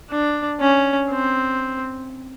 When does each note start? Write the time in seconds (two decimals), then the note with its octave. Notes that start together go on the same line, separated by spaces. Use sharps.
0.10 D4
0.61 C#4
1.10 C4